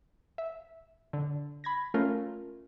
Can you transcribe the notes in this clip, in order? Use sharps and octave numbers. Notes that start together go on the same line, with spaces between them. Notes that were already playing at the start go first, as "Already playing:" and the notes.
E5
D3
B5 G#6 A#6
A3 C#4 F4 A#4